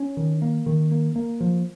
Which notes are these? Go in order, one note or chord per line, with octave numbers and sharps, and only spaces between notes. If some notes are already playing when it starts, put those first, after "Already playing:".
Already playing: C#4
D#3
A#3
D#3
A#3
A#3
F3